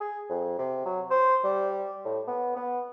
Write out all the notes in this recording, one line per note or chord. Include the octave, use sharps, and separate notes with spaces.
G#4
F2
C3
F#3
C5
G3
A2
B3
B3